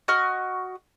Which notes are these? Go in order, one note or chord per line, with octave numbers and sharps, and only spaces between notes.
F#4 D#5 C#6 F6